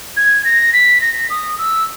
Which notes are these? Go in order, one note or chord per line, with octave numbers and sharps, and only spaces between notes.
G#6
A#6
B6
A#6
D#6
E6